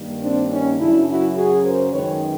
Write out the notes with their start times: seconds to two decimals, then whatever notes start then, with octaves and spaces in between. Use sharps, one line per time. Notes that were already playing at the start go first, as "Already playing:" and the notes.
Already playing: G2 D#3 G3 A#3
0.21 C4 D4
0.50 C#4 D#4
0.79 F#2 C#3 F#3 D4 E4
1.07 E4 F#4
1.36 F#4 G#4
1.64 A#4 C5
1.92 F#2 D#3 G#3 B4 C#5